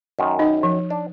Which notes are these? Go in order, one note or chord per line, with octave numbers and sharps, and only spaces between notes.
F#2 D#3
D#4 D#5
F3
D4